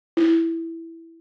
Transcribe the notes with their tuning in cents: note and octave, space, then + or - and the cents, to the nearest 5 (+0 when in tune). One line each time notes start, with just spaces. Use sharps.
E4 +0